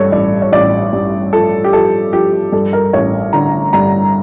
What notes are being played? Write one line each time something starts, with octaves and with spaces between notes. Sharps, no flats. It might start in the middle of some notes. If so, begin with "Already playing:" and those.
Already playing: A1 G2 A4 C#5
A1 D5
C#5
A1 D5
G2
F3 A4
G4
F3 A4
F3 G4
G2 A4
A#4
A1 C#5
D3 A#5
G2 A#5